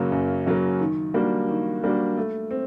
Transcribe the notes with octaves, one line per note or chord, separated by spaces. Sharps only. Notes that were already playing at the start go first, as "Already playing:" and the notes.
Already playing: F#2 C#3 F#3 A#3
F#2
C#3 F#3 A#3
D#3
G3 A#3 D4 F#4
D#3
G3 A#3 D4 F#4
A3
C4